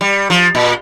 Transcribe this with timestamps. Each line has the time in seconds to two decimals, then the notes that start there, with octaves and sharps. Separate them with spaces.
0.01 G3
0.30 F3
0.55 A#2